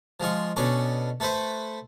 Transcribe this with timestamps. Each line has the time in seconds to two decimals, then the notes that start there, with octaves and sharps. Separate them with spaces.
0.20 F3 G#3 F4 C#6
0.56 B2 C#4 D4 A4 C#6
1.20 A3 A4 B4 C5 E5